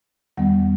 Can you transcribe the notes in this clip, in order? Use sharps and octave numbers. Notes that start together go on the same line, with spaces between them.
E2 D#3 G3 B3 F#5